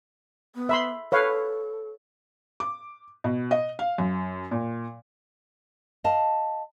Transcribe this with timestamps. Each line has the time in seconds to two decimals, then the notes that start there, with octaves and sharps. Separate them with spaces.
0.55 B3
0.69 E5 B5 C6
1.12 A4 B4 C#5 F5
2.60 D6
3.24 B2
3.51 D#5
3.79 F5
3.98 F#2
4.51 A#2
6.04 D#5 F5 A5